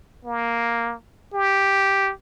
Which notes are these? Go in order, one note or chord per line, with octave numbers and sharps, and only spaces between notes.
A#3
G4